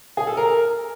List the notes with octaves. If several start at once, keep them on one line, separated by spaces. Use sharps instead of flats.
G#4
A4
A#4